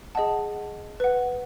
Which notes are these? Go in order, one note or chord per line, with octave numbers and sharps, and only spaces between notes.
G#4 D#5 F#5 A5
B4 F#5